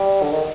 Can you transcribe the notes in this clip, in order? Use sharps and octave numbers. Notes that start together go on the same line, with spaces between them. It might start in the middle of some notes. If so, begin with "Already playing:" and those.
Already playing: G3
D3
D#3